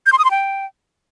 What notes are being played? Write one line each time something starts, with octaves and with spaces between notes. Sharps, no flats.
G6
C6
D#6
C6
G5